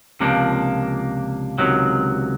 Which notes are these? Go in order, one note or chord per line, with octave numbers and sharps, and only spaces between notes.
C#2 C3 F3 A#3 D4
C#2 C3 D#3 F#3